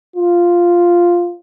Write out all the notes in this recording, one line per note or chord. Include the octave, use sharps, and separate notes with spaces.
F4